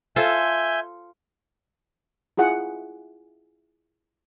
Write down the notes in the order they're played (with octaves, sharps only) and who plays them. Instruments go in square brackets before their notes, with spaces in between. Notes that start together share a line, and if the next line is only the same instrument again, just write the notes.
[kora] F4 A4 C5 [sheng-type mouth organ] E5 G#5 G6
[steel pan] E4 F4 G#4 F#5